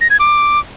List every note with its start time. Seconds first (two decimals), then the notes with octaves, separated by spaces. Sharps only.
0.01 A#6
0.10 G#6
0.20 D6